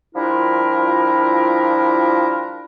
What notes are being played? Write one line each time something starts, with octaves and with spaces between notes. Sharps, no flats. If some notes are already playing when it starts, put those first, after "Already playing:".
F3 G3 D4 E4 F4 A#4